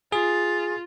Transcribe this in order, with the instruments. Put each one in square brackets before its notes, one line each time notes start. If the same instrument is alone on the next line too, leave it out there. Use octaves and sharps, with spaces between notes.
[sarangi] F4 [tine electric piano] G#4